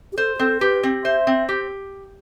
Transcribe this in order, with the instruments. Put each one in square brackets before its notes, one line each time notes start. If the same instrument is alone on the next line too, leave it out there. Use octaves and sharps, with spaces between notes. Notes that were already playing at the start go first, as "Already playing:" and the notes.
[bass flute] G4
[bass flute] A4 [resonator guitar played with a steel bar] C5
[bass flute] G4
[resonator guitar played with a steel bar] C4 [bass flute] A4
[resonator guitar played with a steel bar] G4 [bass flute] B4
[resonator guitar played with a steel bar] C4
[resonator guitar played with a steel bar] C5 [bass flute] E5
[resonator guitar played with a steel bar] C4
G4